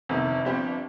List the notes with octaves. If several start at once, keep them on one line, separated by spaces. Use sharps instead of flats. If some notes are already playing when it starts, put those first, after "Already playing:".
G1 F2 C3 D#3
G1 G2 F3 C4 G4